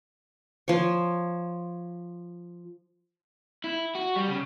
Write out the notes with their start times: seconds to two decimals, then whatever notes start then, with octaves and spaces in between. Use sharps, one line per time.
0.68 F3 C#5
3.64 E4
3.95 F#4
4.16 G3
4.27 C#3